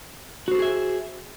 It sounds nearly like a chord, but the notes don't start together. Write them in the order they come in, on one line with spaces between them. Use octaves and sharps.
F#4 C5 A4 G#4 E5